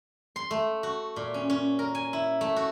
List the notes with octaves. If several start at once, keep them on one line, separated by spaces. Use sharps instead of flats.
C6
A3
F#4
A#2
C#4
C#4
A#4
G#5
E4
A3
F#4